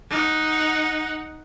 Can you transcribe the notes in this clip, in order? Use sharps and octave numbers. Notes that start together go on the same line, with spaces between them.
D#4 F#5